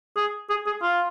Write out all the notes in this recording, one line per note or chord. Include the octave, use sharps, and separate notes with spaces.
G#4
G#4
G#4
F4